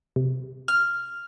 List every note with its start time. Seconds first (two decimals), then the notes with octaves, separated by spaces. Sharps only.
0.16 C3
0.68 F6